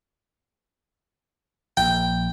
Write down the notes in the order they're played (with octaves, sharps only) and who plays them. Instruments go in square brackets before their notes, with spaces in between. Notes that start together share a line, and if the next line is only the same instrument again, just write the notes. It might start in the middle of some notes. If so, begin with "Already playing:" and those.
[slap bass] A#1 [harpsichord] G5